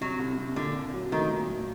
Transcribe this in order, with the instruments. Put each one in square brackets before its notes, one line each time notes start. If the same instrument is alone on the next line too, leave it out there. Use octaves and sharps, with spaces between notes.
[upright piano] C3 [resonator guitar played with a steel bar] F#3
[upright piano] C2
C3
[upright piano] A#2 [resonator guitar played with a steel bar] D3
[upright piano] C2
F#3
[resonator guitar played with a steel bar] D#3 [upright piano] A3
[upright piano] A#2
A#2